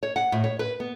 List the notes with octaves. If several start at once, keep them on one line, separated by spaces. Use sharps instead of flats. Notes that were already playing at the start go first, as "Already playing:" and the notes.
C#5
F#5
A2
C#5
B4
B3